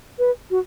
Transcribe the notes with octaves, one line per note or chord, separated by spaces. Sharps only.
B4
F#4